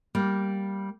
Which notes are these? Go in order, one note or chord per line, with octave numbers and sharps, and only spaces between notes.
G3 A#3